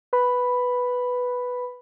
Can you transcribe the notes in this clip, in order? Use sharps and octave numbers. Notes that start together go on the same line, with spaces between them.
B4 B5